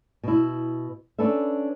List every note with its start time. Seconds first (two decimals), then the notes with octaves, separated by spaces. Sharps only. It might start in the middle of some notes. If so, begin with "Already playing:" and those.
0.24 B2 E4
1.19 C#4 D4 A4 B4 E5